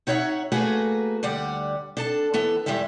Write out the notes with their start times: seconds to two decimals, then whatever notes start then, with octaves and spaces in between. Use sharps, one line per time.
0.07 D#4 F#4 C#5 E5 F#5
0.52 A3 A#3 F#4 G#4 B4
1.23 D2 G3 D5 F#5
1.97 D4 A4 A5
2.34 E3 B3 A4
2.66 E2 G3 G#3 E4 E5